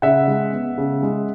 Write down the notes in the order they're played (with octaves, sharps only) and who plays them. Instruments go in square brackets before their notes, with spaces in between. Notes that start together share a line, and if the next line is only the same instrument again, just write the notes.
[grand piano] C#3 E5 F#5
G#3
B3
C#3
G#3